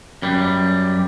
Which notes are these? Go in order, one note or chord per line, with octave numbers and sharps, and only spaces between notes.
F#2 G3